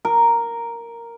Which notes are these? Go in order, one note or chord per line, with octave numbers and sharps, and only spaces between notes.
A#4